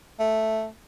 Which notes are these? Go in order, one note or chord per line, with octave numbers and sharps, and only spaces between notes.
A3